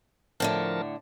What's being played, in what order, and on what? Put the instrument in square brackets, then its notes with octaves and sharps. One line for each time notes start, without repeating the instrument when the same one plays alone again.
[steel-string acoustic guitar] A2 D3 A3 [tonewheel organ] F3 A#4 A5